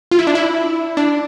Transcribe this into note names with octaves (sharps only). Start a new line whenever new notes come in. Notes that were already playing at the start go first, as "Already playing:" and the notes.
F4
E4
D4
E4
D4